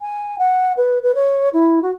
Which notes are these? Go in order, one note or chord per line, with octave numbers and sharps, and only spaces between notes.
G#5
F#5
B4
B4
C#5
E4
F#4